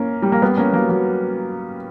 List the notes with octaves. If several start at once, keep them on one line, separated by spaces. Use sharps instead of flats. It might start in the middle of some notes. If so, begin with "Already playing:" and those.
Already playing: A#3 C#4
G3
A#3
G3 B3
A#3 C#4
F#3 A#3
F#3 A#3